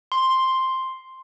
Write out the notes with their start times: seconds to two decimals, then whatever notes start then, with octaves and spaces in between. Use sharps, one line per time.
0.12 C6